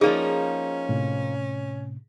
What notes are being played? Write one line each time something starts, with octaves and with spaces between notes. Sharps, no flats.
F3 A#3 C#4 D#4 G#4 D5
A2 C3